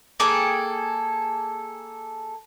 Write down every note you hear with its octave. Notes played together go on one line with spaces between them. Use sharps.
A#3 G#4 A4 G5